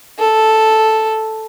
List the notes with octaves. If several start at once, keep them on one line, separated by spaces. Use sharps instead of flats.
A4